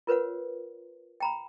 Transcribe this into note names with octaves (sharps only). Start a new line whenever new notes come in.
F4 A#4 B4 C#5 F#5
G5 A#5 B5